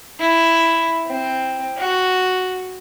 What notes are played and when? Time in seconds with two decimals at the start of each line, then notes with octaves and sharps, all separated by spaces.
0.20 E4
1.07 C4
1.77 F#4